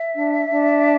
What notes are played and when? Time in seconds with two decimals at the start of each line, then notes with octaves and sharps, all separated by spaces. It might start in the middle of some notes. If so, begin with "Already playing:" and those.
Already playing: E5
0.13 D4
0.49 D4